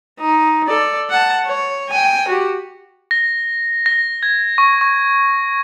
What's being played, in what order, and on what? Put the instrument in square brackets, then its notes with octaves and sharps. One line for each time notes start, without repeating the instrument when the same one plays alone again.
[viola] D#4
A4 D5
F#5 A5
C#5
G5 G#5
F#4 G4
[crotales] A#6
A#6
G#6
C#6
C#6